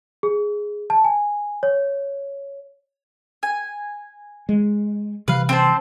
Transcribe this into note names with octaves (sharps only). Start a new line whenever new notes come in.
G#4
A5
G#5
C#5
G#5
G#3
C3 E3 G3 B4 F5
C4 C5 A5